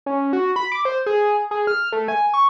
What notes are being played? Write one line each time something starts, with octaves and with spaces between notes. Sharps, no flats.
C#4
F#4
B5
D6
C5
G#4
G#4
F6
A3
G#5
C#6